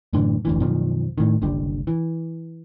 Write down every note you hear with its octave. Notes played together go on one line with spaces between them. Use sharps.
F#2 A2 D3 E3
F1 D2 E3
F#2 B2 D#3 F3
A2 D#3
F#1 C2 D3 G3
E3